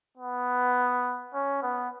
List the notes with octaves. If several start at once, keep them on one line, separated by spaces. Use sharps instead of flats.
B3
C#4
B3